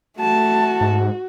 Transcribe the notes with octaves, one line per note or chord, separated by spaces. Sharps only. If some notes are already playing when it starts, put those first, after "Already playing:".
A3 F#4 A5
G#2